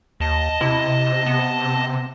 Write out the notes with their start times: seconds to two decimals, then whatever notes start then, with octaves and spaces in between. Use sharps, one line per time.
0.20 D#2 D#5 A5
0.61 C3 E4
1.26 B3